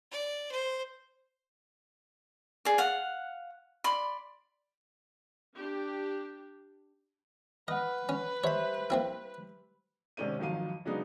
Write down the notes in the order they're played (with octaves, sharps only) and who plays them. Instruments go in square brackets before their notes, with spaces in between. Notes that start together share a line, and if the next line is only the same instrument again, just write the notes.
[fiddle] D5
C5
[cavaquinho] G#4 D5
F5 F#5
D5 B5 C6
[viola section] D4 G4
[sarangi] B4 [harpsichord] D#5 [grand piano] F#5 F6
[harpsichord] C#4
[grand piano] G3 C5 E5 [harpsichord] C#5 B5
[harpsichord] A#3 C4 E4
[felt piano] G#2 C3 D#3 C#4 D5 D#7
G#1 F2 D#3 F#3 F5 D#7
C#3 F#3 G#3 B3 D4 D#4